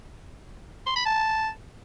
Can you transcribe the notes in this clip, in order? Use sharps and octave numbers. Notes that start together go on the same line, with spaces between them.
C6
B5
A5